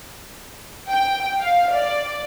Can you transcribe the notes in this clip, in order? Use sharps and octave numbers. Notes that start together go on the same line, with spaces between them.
G5
F5
D5